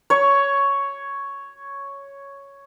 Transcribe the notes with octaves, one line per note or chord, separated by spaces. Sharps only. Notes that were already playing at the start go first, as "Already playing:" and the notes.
C#5 C#6